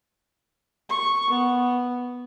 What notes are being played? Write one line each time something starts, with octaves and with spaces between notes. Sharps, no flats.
C#6
B3